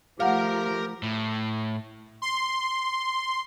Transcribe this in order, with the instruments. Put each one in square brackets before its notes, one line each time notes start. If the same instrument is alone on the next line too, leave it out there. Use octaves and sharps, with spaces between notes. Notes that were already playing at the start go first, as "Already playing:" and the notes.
[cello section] F3 A3 [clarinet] G4 [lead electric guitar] A#4 A#5 [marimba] F5 F#5
[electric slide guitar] A2
[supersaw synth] C6